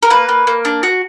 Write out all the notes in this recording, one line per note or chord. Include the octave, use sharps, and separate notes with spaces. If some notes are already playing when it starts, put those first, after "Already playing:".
A#4
A#3 B4
A#3
A#3
D4
F#4